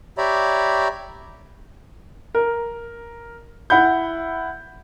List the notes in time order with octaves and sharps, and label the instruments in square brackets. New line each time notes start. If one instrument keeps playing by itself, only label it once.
[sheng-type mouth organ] G4 C#5 D5 E5 A#5 B5
[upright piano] A#4
E4 F#5 B5 G6